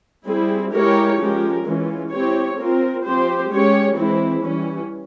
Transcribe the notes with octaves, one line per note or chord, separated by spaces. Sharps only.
G3 C4 E4 G#4
G#3 E4 G4 A#4 C#5
F3 G#3 C#4 G4 A#4
E3 G#3 C#4 F4
C4 E4 G4 C#5
C4 F4 A#4
F3 C4 G4 C5
G#3 C#4 G4 C#5
E3 G#3 C4 E4
E3 G3 C#4